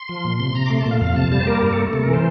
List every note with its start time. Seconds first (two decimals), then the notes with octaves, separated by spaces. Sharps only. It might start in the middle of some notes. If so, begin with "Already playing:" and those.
Already playing: C6
0.09 F3
0.24 A#2
0.40 C3 C6
0.55 C3 A#5
0.66 D6
0.70 A3 C6
0.81 A5
0.86 A#2
0.91 F5
1.01 F2 F5
1.16 C3 A5
1.32 G3 A5
1.40 C5
1.47 A#3 A#4
1.62 G2 A#4
1.73 A4
1.77 A3
1.93 C3 A4
2.03 A#4
2.08 E3 C5